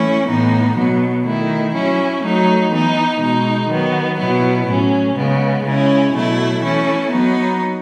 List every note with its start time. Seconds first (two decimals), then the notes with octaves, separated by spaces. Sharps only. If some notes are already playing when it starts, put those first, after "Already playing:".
Already playing: E3 A3 C#4 E4
0.28 A2 E3 B3 D#4
0.76 B2 F#3 B3
1.26 D#3 A3 E4
1.74 F#3 C#4 E4
2.24 F#3 A3 D#4
2.73 E3 B3 D#4
3.21 B2 G#3 D#4
3.69 D#3 F#3 B3
4.19 B2 F#3 B3 E4
4.68 A2 F#3 C#4
5.16 C#3 G#3 B3
5.65 C#3 G#3 C#4 E4
6.14 B2 F#3 A3 E4
6.63 E3 A3 C#4 E4
7.12 F#3 B3 D#4